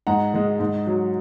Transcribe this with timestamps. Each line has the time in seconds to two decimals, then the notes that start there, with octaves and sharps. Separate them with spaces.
0.07 G#2 F#5 A#5
0.34 D#3 G#3
0.60 G#2
0.87 F#3